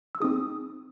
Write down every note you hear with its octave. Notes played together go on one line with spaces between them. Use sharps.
E6
C4 D#4 G#4 D#6